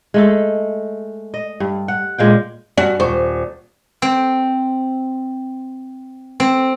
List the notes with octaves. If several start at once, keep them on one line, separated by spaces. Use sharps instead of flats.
G#3 A3 A4
D#5
G2
F#5
A#2 G#3 F5 G5
G2 F#4 D5
D#1 C5 C#6
C4
C4